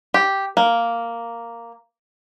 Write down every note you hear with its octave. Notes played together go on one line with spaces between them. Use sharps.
G4
A#3